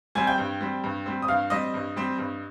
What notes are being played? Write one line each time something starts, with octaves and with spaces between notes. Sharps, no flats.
G3 C4 G#5 G#6
G5 G6
G2
G3 C4
G2
G3 C4
D#6
G2 F5 F6
G3 C4 D#5 D#6
G2
G3 C4
G2